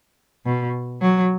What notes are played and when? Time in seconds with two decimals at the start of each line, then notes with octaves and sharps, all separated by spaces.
0.46 B2
1.01 F#3